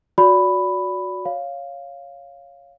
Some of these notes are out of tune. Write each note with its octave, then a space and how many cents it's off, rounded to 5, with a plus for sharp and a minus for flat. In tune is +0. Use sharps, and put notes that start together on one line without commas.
F#4 -15 D5 -30 B5 +5
C#5 +0 F5 +0